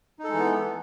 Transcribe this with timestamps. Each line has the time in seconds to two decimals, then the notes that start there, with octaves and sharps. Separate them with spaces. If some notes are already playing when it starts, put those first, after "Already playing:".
0.19 D#4
0.24 A4
0.29 G#3
0.34 E3
0.38 B3